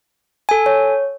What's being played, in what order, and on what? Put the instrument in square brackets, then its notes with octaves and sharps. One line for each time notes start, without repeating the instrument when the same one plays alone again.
[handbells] A4 G#5
[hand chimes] C#5